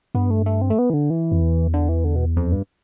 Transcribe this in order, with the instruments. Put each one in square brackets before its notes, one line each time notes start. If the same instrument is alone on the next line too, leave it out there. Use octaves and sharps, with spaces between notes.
[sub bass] G2 [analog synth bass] B3
[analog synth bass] A3
A3
C4
A3
B3
E3
D3
E3
[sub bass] F2
E2
[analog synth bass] D3
E3
D3
B2
F2
G2